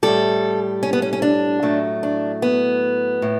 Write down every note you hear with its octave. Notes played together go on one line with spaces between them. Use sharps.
A2 G3 A4
C#4
B3
C#4
C#4
D4
A2 F#3 A3
D4
B3
A2